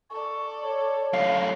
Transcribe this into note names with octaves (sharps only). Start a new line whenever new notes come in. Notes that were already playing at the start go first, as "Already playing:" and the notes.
A4 D5 C#6
C#5
F#2 A2 F5